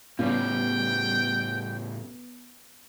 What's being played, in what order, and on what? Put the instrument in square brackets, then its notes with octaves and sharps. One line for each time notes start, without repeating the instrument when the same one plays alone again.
[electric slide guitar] A2 C#3 [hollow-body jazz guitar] G3 C#4 F4 [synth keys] B3 [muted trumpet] G5